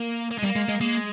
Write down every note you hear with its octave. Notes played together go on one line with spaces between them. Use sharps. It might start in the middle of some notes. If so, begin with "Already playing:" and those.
Already playing: A#3
A#3
G#3
G3
A#3
G#3
G#3
G#3 A#3